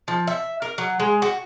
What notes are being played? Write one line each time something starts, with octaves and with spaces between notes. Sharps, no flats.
F3
E5
A#4
F#3
G#3
F#4